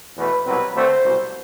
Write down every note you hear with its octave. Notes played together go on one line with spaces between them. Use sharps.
E2 B2 A3 B4
C2 B2 F#3 C4 B4
D2 D3 A3 C4 C5
C2 B2 F#3